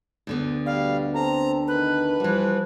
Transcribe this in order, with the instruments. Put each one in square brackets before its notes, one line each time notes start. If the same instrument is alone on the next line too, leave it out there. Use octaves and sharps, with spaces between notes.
[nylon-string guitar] D2 D3 B3
[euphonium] B2 [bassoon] G3 [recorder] F5
[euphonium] C4 [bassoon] A4 [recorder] A#5
[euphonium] D#3 [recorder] B4
[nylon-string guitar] E3 G3 [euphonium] F3